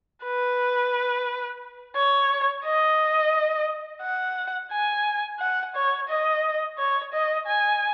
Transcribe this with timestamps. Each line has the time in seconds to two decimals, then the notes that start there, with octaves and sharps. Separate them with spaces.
0.24 B4
1.95 C#5
2.65 D#5
4.02 F#5
4.72 G#5
5.39 F#5
5.75 C#5
6.09 D#5
6.78 C#5
7.13 D#5
7.47 G#5